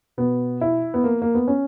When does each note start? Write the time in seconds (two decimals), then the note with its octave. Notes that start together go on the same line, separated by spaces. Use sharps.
0.17 B2 B3
0.61 E4
0.94 B3
1.04 A#3
1.22 A#3
1.35 B3
1.48 C#4